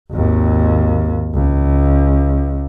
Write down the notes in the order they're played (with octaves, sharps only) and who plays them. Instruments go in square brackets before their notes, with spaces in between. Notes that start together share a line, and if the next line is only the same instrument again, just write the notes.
[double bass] G#1 D#2
C#2